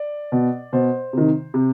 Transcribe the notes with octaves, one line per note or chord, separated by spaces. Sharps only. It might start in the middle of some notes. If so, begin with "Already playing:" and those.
Already playing: D5
B2
B2 C5
C3 D#3
C3